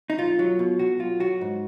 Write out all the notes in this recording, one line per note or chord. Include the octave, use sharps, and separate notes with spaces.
D#4
B1 F4
F#3
B2
B1 F#4
B1 F4
F#3 F#4
G#2